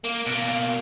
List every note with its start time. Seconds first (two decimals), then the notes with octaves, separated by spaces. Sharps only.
0.04 A#3
0.26 B2 A#3